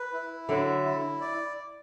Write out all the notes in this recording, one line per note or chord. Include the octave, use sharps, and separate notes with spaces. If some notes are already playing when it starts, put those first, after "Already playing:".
Already playing: B4
E4
D3 F#3 E5
E4
D5